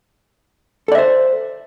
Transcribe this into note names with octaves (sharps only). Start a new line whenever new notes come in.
A4 C5 D5 E5